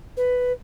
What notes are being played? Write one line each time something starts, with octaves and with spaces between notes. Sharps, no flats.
B4